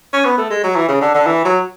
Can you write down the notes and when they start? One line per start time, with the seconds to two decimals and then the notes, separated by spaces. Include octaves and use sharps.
0.13 C#4
0.25 B3
0.38 A3
0.50 G#3
0.64 F#3
0.76 E3
0.88 C#3
1.01 D3
1.14 D3
1.27 E3
1.45 F#3